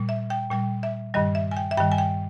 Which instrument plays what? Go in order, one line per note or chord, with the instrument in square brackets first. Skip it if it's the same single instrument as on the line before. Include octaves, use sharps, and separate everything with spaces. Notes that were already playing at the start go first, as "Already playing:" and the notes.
Already playing: [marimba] A#2 G3
E5
G5
A#2 G3 G5
E5
G2 D#3 G3 D#5
E5
G#5
G5
E5
G2 D#3 G3 G5
G#5
G5